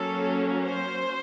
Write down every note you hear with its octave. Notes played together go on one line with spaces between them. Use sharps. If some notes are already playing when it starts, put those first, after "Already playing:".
Already playing: F#3 A#3 C#4 A4
C5